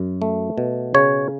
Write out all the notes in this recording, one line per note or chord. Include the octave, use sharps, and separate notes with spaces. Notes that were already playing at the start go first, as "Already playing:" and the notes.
Already playing: F#2
A3
B2
C#3 C#5